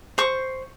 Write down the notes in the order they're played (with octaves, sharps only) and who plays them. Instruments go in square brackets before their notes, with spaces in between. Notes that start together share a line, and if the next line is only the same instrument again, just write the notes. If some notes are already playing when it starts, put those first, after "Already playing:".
[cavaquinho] C5 C#6